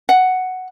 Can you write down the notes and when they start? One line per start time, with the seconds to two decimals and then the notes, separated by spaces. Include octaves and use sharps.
0.09 F#5